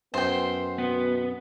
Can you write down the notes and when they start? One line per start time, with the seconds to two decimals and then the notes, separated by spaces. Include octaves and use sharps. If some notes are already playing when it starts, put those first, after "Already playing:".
0.14 F#2 B3 C5 G5
0.78 B2 B3